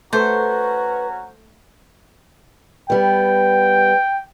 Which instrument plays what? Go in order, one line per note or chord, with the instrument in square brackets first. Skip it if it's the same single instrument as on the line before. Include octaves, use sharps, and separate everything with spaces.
[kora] A3 A4 [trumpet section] C#4 F#4 A#5 [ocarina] B4 [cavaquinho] C5
[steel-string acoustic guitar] G3 B3 [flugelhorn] G5